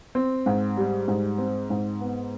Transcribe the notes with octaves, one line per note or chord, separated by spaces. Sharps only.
C4
G#2
G3
G#2
C4
G#2
B3